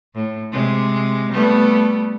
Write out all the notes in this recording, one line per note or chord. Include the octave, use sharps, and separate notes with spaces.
A2
C3 G#3
G3 A3 B3